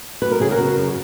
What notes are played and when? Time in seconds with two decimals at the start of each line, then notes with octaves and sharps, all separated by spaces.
0.22 F#2 B4
0.31 A#4
0.40 C#3 G#4
0.51 F#4 A#4
0.58 C#3
0.76 F#2